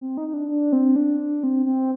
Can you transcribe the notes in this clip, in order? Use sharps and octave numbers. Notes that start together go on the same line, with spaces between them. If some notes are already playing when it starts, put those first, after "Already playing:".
C4
D#4
D#4
D4
D4
C4
D4
C4
C4